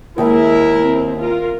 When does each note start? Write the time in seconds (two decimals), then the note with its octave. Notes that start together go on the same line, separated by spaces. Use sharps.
0.18 D#2 G#3 E4 A#4
0.82 C4
1.19 F4 A#4